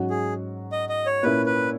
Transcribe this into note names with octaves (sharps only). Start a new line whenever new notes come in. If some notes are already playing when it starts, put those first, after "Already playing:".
Already playing: G#2 F#3 C#4 F#4
G#4
D#5
D#5
C#5
A#2 A#3 C#4 E4 B4
B4